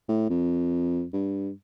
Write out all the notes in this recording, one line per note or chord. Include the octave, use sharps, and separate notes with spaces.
A2
F2
G2